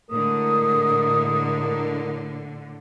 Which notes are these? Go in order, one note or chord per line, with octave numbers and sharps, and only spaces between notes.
A2 D3 G#3 E4 A#4 D#6